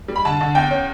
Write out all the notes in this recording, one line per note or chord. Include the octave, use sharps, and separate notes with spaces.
G3
B5
D3 A5
D3
E2 G5
C#4